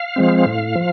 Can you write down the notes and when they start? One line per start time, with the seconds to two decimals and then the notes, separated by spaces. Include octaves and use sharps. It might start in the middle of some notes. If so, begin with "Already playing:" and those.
Already playing: F5
0.16 F3 G#3 C4
0.46 A2
0.76 F3